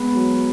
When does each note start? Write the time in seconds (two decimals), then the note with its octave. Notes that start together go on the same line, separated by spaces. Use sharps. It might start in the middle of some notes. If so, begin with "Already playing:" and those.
Already playing: G#3 B3
0.15 F#3